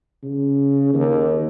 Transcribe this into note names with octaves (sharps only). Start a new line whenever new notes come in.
C#3
D#2